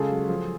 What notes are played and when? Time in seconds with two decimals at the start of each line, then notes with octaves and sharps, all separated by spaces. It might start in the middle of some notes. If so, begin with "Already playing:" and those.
Already playing: C#3 G#3 F4 G#4 A4
0.10 F#3
0.29 F3